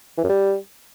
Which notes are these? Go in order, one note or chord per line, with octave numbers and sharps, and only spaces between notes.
E3
F#2
G3